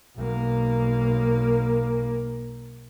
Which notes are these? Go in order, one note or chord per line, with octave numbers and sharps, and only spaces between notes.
B1 A#3